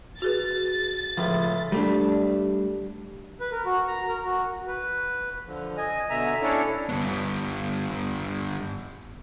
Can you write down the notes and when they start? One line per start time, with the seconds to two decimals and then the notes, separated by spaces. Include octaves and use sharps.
0.22 F#4 G#4 B4 A6
1.18 C#2 A2 F3
1.72 G3 A3 D4
3.40 B4
3.51 A#4
3.65 F#4
3.87 A#5
4.08 A#4
4.25 F#4
4.67 B4
5.47 D3 F3
5.77 D#5 G#5
6.10 B2 D3 E5 G#5 A#5
6.42 C#4 D4 E4 A4 C#5
6.89 G2 B3